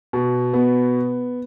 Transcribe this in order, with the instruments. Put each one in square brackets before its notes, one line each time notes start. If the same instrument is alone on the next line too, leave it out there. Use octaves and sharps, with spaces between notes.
[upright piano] B2
B3